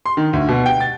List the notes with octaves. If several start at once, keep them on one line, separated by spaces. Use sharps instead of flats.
C6
D#3
D2
B2
G5
A6